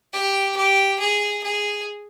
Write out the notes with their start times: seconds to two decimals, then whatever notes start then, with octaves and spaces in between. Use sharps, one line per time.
0.13 G4
0.56 G4
1.00 G#4
1.43 G#4